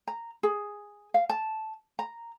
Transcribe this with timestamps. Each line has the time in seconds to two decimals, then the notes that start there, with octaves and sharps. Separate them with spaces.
0.07 A#5
0.43 G#4
1.14 F5
1.29 A5
1.99 A#5